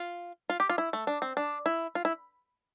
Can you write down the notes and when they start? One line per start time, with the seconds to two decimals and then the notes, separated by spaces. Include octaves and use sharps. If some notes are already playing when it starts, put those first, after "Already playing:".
Already playing: F4
0.50 F4
0.60 G4
0.70 F4
0.78 E4
0.93 A3
1.07 D4
1.22 C4
1.37 D4
1.66 E4
1.95 F4
2.05 E4